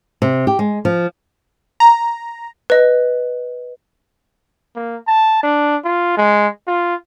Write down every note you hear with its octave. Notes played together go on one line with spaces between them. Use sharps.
C3
G4
G#3
F3
A#5
B4 D#5
A#3
A5
D4
F4
G#3
F4